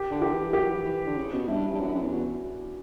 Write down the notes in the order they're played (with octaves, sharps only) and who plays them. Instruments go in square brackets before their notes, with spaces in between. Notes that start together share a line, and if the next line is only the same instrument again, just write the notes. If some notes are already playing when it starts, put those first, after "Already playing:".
Already playing: [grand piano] G4
[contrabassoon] D3
[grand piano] G4
[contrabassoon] E3
[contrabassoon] F#3 [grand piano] G4
[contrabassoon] E3
E3
D3
C#3
B2
[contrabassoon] G2 [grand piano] E4
[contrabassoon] G2 [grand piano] C#4
[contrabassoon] F#2 [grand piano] D4
[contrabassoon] F#2
E2
[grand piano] F#4